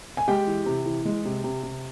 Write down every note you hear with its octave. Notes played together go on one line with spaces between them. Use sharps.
G#5
G#3 G4 G5
E3
C3
E3
G#3
C3
C3
C3